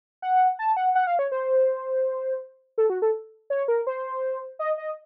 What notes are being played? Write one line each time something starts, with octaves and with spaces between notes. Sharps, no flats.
F#5
A5
F#5
F#5
F5
C#5
C5
A4
F#4
A4
C#5
A#4
C5
D#5
D#5